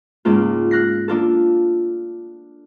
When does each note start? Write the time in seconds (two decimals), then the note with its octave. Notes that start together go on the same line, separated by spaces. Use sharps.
0.25 C#2 G#2 A#3 F4
0.71 F6 F#6 A#6 C7
1.08 A#3 D4 F4 A4